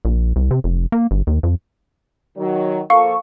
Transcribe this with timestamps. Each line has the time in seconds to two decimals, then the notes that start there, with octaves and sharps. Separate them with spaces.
0.05 A#1
0.36 C2
0.51 C3
0.64 F1
0.92 A#3
1.11 G1
1.27 D#2
1.43 F2
2.37 D#3 F#3
2.90 F3 A#3 A4 F5 C#6